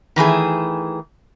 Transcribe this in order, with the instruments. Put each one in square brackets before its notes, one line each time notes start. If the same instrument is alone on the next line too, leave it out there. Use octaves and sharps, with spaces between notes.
[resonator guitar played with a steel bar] D#3 E3 A3 G#4